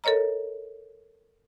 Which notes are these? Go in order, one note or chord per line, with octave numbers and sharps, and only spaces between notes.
A4 A#4 C#5 D#5 A#5